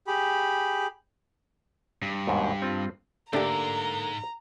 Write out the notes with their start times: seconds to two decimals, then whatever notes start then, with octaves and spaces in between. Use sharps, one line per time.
0.07 G4 G#4 B5
2.02 G2
2.27 D#2 G#2 B2
2.62 C4 F4
3.33 G#2 D3 A3 A#3 D4 G4 A#5